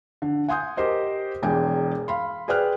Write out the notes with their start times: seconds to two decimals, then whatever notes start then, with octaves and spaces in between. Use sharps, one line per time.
0.22 D3
0.48 F#5 G#5 C6 D#6 G6
0.77 G4 A#4 C5 D#5
1.42 E1 E2 G5 G#5
2.08 F5 B5 C6
2.48 G#4 B4 D5 G5 F6 F#6